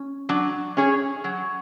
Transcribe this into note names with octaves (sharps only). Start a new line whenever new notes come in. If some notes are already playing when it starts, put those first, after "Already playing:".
Already playing: C#4
F#3 D4
C#4 G#4 C#5
F#3